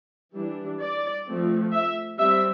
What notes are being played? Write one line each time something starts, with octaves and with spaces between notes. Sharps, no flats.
E3 G3 D4
D5
F3 A3 C4
E5
G3 C4 E5